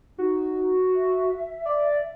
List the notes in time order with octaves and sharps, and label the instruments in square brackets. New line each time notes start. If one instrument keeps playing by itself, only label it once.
[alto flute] D#4 [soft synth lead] F#4
[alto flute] E5
[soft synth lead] D5